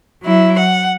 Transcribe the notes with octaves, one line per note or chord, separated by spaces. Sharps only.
F#3 E4
F#5